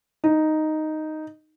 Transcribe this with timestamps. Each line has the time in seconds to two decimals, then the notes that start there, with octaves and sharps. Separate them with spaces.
0.24 D#4